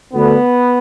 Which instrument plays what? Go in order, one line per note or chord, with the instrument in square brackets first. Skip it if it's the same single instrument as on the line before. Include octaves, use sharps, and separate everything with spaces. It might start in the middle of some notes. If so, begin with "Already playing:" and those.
[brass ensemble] D2 D3 B3